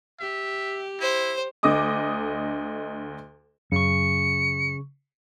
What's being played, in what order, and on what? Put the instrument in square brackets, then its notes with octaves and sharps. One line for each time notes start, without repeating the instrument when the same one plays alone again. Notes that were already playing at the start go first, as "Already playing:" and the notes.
[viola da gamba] G4 [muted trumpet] E5
[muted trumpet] E4 [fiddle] C5
[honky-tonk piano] D2 D3 D#5 D6 D#6
[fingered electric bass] F#2 [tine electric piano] C#3 C#6 [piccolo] C#7